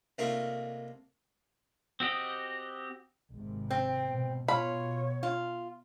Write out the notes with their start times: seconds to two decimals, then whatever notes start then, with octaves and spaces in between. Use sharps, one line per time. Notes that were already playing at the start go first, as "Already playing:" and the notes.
0.18 C2 A3 A#3 D#4 F4 C#6
2.00 C4 F#4 G4 D#5
3.31 G#1 C3
3.70 C4 G5
4.06 B2
4.48 B2 F4 C#5 B5
5.23 F4